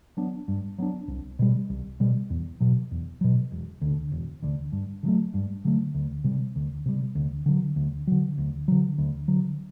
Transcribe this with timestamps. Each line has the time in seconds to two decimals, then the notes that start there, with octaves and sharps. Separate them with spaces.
0.17 F#3 B3 D4
0.48 G2
0.78 F#3 B3 D4
1.08 C2
1.39 B2 G3
1.70 C2
2.00 B2 G3
2.30 E2
2.60 B2 F#3
2.91 E2
3.21 B2 F#3
3.52 E1
3.81 D2 D3
4.12 E1
4.42 D2 D3
4.72 G2
5.03 D3
5.06 F#3 A3
5.34 G2
5.65 D3 F#3 A3
5.95 D2
6.24 C3 G3
6.56 D2
6.86 C3 G3
7.15 D2
7.46 D3 F#3
7.76 D2
8.07 D3 F#3
8.38 D2
8.68 D3 F#3
8.98 D2
9.28 D3 F#3